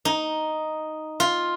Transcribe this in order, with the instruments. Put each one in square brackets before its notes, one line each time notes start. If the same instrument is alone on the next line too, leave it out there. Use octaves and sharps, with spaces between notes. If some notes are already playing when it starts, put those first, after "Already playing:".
[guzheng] D#4
F4